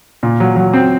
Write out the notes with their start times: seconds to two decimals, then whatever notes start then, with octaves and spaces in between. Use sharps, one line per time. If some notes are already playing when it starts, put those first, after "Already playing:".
0.23 A#2
0.40 F#3
0.56 F#3
0.73 C4